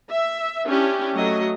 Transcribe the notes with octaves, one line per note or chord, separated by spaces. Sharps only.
E5
C#4 D4 E4 G4
F#3 A3 D#5